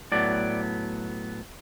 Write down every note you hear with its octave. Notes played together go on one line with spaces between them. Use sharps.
A2 F#3 B3 D5